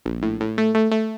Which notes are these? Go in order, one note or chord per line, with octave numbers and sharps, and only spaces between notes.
A#1
A2
A2
A3
A3
A3